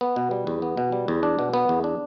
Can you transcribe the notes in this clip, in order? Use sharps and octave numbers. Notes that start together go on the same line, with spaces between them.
B3
B2
G3
E2
B3
B2
G3
E2
D4
B2
B3
E2
D4